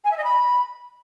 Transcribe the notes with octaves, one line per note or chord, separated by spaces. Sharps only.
G#5
E5
D#5
B5